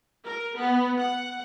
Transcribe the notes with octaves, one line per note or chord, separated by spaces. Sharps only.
A#4
B3
F#5